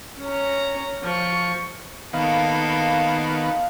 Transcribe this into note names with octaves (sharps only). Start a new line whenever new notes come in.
C#4 A#5
F3 C#6
D#3 A#3 B3 A4 F5